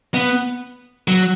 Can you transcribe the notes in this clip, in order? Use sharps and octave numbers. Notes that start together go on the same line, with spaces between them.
B3
F#3